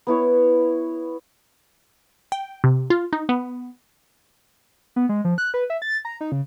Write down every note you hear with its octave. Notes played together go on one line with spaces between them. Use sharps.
B3 E4 C#5
G5
C3
F4
D#4
B3
B3
G#3
F3
F#6
B4
E5
A6
A#5
D#4
C#3